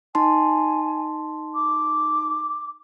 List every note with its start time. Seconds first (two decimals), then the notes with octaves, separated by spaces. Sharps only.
0.15 D#4 G#5 A5 C6
1.54 D6